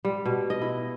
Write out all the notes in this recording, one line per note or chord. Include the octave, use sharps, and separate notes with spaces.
G3
B2
D#5
E4